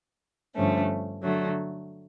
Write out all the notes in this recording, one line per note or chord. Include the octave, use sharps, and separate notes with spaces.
G2 D3 F3 A3 C#4
D3 F#3 A3